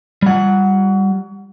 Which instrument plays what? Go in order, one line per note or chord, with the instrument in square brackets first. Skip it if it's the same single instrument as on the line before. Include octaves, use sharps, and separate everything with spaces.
[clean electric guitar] G3 F#5